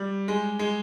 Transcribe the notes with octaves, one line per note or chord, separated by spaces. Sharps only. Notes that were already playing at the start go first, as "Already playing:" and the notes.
Already playing: G3
G#3
G#3